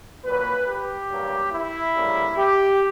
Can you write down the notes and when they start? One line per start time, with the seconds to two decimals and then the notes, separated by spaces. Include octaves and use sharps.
0.24 A#2 F#3 A#3 B4
0.67 G4
1.09 G2 F#3 A#3
1.52 E4
1.94 D2 C#3 G3 A#3
2.37 G4